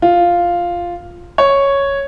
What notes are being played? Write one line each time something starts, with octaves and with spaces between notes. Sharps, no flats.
F4
C#5